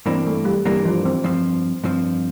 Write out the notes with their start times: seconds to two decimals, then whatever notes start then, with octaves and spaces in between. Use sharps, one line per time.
0.06 G2 E3 A#3 C4 D4
0.27 A3
0.45 G3
0.65 G2 E3 G3 A#3 D4
0.85 F3
1.05 C4
1.24 G2 F3 C4
1.84 G2 F3 C4